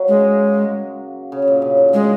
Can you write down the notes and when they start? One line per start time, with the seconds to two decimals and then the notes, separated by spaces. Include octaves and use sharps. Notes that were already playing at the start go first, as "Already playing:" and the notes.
Already playing: F#3 A#3
0.08 C#3 G#3
1.32 C#3
1.42 C#3
1.48 A#2
1.62 C#3
1.77 D#3
1.88 C#3
1.93 D#3 G#3